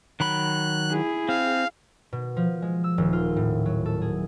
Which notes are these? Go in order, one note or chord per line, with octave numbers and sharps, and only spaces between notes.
D#3 F#3 B5 F#6
E4 G#4
C4 F5
B2
F3
G#3
E6
D#1
F4
A2
F#3
A4
G#4